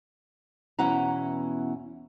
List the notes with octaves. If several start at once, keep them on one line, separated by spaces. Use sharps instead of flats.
E2 B2 C#4 E4 F#5 A#5